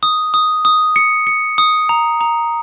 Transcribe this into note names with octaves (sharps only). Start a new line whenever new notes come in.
D#6
D#6
D#6
C#7
C#7
D#6
A#5
A#5